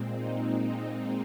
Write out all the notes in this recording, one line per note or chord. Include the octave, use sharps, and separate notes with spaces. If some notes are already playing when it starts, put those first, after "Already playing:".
Already playing: A#2 G#3 C4
D#4